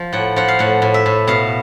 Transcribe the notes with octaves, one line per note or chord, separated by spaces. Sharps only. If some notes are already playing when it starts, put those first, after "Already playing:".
Already playing: F3
A2 F#5
F3 F#5
F5
A2 F#5
A2
E5
A2
B2 F5